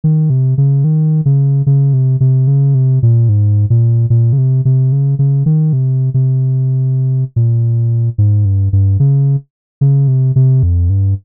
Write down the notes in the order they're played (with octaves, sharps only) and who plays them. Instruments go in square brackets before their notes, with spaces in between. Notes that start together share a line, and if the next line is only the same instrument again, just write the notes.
[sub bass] D#3
C3
C#3
D#3
C#3
C#3
C3
C3
C#3
C3
A#2
G#2
A#2
A#2
C#3
C3
C3
C#3
C#3
D#3
C3
C3
A#2
G#2
G2
G2
C#3
C#3
C3
C3
F2
G2